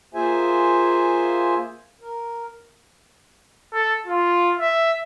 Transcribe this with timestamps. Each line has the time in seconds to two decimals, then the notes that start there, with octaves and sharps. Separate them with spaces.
0.14 A#3 F4 G#4 C5 E5 G#5
2.01 A#4
3.73 A4
4.07 F4
4.59 E5